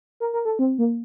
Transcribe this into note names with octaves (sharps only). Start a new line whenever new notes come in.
A#4
A#4
A4
C4
A#3